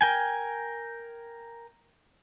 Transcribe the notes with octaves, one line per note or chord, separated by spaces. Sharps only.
A#4 G5 G#5